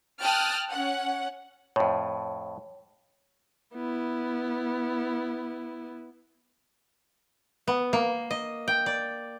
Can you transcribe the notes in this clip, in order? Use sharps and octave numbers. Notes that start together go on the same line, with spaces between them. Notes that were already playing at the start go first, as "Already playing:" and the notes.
G5 A5 D#6 F6 F#6
C#4 F#5
F2 A2 C#5
B3 E4
B3
A#3
D#5
G5
D5